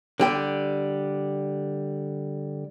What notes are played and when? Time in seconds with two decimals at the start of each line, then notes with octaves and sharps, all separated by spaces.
0.20 D3 G3 G5